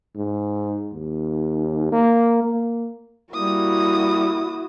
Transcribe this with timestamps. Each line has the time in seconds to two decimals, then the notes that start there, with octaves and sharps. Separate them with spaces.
0.16 G#2
0.93 D#2
1.92 A#3
2.43 A#3
3.33 G3 A#3 E4 F#4 D#6